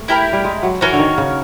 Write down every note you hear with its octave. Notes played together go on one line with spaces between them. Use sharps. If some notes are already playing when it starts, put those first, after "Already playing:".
Already playing: A3
E4 G4 A#4
G3
G#3
F#3
E3 C#4 F#4 A#4 C#5
D3
D#3
C#3